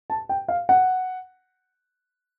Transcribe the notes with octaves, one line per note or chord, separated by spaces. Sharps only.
A5
G5
F5
F#5